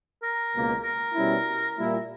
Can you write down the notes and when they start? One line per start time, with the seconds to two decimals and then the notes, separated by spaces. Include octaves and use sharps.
0.23 A#4
0.53 C#2 B2 A#3
0.83 A#4
1.13 B2 G3 C#4 E4
1.75 A#2 G3 A#3 E4